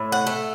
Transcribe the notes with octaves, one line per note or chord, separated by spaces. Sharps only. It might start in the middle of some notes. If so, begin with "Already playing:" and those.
Already playing: A2
F#5
A3